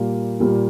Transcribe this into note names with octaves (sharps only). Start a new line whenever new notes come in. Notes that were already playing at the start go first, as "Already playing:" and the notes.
Already playing: A#2 G3 A#3
A#2 G3 A#3